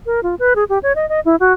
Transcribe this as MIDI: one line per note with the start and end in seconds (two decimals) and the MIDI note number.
0.06 0.20 70
0.23 0.35 65
0.39 0.54 71
0.56 0.64 68
0.69 0.79 67
0.83 0.93 73
0.96 1.08 75
1.09 1.20 75
1.25 1.36 64
1.40 1.53 66